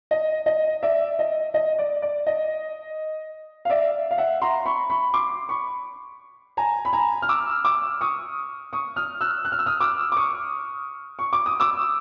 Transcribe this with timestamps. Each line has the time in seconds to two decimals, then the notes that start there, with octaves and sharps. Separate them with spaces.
0.11 D#5
0.46 D#5
0.83 D5 E5
1.19 D#5
1.54 D#5
1.79 D5
2.02 D5
2.27 D#5
3.65 F5
3.70 D5 E5
4.11 F5
4.18 E5 F#5
4.42 A#5 C6
4.65 B5 C#6
4.90 B5 C#6
5.14 C6 D6
5.49 B5 C#6
6.57 G#5 A#5
6.85 B5
6.93 G#5 A#5
7.22 F6
7.29 D6 E6
7.65 D6 E6
8.01 C#6 D#6
8.73 C#6 D#6
8.96 D#6 F6
9.21 E6 F#6
9.45 F#6
9.52 F6
9.59 E6
9.66 D#6 F6
9.80 D6 E6
10.12 D6
10.17 C#6 D#6
11.19 C#6
11.33 D6
11.46 D#6
11.60 D6 E6